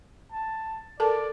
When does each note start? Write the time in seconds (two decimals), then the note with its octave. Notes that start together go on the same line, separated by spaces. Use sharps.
0.32 A5
1.00 A4 A#4 D5 A5